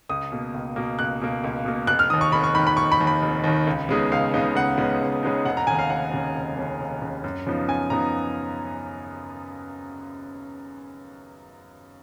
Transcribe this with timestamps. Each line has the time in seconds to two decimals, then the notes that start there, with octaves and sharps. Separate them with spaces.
0.09 C#2 D#6
0.32 B2 A#3
0.54 C#2
0.76 B2 A#3
0.99 C#2 F#6
1.22 B2 A#3
1.44 C#2
1.65 B2 A#3
1.87 F1 F#6
1.99 F6
2.10 D#2 D#3 D#6
2.21 C#6
2.32 F1 B5
2.44 C#6
2.55 D#2 D#3 B5
2.67 B5
2.77 F1 C#6
2.92 B5
3.00 D#2 D#3
3.07 B5
3.23 F1
3.44 D#2 D#3
3.67 C#2
3.89 C#3 G#3 B3 D#4
4.12 C#2 F5
4.34 C#3 G#3 B3 D#4
4.55 C#2 F#5
4.78 C#3 G#3 B3 D#4
5.01 C#2
5.23 C#3 G#3 B3 D#4
5.45 F1 F#5
5.57 A#5
5.67 D#2 C#3 G#5
5.79 F5
5.90 F1 F#5
6.12 D#2 C#3
6.35 F1
6.57 D#2 C#3
6.80 F1
7.02 D#2 C#3
7.24 F#2
7.47 C#3 F3 B3 D#4
7.68 F#2 G#5
7.90 C#3 F3 B3 D#4 A#5